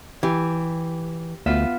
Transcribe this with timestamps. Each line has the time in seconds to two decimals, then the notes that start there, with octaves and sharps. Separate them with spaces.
0.23 E3 G4
1.46 D2 B3 F4 E5